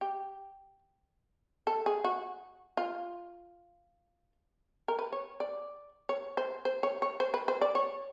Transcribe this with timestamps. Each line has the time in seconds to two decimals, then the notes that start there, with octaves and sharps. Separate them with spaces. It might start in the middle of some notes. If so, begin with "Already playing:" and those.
0.01 G4
1.67 A4
1.86 G#4
2.04 F#4
2.77 F4
4.88 A#4
4.99 B4
5.12 C#5
5.40 D5
6.09 C#5
6.37 C5
6.65 C5
6.83 C#5
7.02 C#5
7.20 C5
7.34 B4
7.48 C5
7.61 D5
7.75 C#5